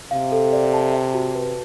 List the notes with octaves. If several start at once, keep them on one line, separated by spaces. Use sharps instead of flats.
C3 F5
A4
D5
A5
E5
F#4
B4